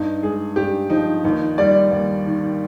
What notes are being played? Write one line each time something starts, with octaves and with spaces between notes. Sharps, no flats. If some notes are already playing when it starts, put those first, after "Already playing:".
Already playing: G2 D#4
G#3 G#4
G2 G4
F3 D#4
D#2 D#4
G3 D5
D#2
D#3